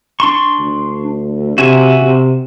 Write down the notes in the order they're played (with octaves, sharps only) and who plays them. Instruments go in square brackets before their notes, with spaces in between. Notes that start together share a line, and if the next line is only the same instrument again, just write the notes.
[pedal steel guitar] D4 C6 C#6
[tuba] D2
[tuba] C3 [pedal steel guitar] F#4 E5 G#5
[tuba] C3